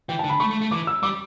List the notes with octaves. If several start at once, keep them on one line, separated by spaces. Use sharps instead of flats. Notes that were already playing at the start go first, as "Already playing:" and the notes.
E3 G5
D3 A5
B5
A3 C#6
A3
A3
E3 D6
E6
G3 D6